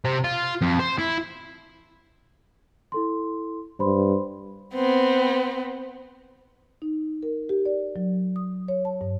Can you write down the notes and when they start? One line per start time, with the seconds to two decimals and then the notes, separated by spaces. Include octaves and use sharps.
0.04 C3
0.24 F4
0.61 F2
0.79 C5
0.98 E4
2.92 E4 A4 C6
3.79 G2 C5 B5 C6
4.74 B3 C4
6.82 D#4
7.23 A#4
7.49 G4
7.66 D5
7.96 F#3
8.36 D#6
8.68 C#5
8.85 A5
9.01 G2